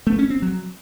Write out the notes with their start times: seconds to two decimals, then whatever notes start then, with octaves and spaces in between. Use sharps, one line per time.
0.07 A3
0.18 C#4
0.30 C4
0.42 F#3